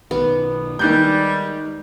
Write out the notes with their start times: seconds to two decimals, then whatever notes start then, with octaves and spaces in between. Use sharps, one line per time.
0.11 B1 B2 D#3 B3
0.79 D#3 G3 G#3 F#6 G6